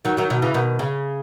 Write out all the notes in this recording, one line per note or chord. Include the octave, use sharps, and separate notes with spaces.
D#3 F#3
D#3 F#3
B2 D#3
C#3 E3
B2 D#3
C#3